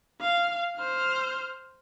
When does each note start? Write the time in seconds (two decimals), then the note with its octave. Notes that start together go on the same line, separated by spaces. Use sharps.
0.21 F5
0.76 C5 F6